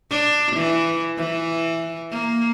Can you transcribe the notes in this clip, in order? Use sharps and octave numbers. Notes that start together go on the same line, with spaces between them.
D4
E3
E3
A#3